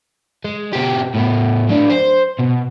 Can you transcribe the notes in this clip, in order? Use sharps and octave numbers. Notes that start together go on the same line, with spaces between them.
G#3
B2 G4
A2 B3
F#3 D4
C5
B2